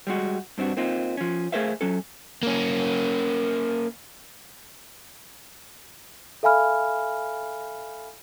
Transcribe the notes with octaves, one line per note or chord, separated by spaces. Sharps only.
G3 G#3 F#4
G2 C4 D4 F#4
A#3 C4 D#4 F4
F3 C#4
A3 G#4 A#4 C5 E5 F5
F#3 C#4 A4
A#3 C#4
A4 E5 F5 G#5 B5 F6